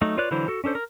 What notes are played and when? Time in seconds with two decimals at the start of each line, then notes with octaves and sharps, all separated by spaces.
0.01 F#3 A3 D#4
0.18 F4 B4 C#5 D5 F#6
0.31 D3 E3 F#3 E4 C5
0.48 F#4 A4
0.64 C#4 D4 A4 C5
0.75 A#4